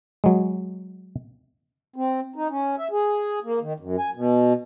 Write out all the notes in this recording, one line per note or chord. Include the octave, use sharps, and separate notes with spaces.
F#3 G#3
C4
D#4
C#4
E5
G#4
A#3
D#3
F#2
G#5
B2